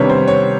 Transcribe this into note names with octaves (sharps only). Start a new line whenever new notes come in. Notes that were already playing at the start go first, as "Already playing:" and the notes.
Already playing: C3 D#3 G3 B3 D4 C#5
C5
C#5